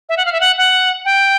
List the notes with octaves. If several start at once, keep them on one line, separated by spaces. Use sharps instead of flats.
E5
F#5
F5
E5
F#5
F#5
G5